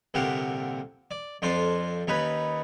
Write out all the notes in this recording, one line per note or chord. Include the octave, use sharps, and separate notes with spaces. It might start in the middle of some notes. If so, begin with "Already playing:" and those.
C2 A#2 D3 G4 F5 F#5
D5
F2 D4 F4 A4 C5 C6
D#2 C#4 D#4 B4 B5